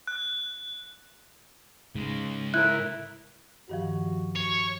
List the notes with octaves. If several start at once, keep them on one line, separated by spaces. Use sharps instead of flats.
F#6
G#2 C#3 G#3
E4 A#4 F#6
G2 D#3 F3 F#4
C#5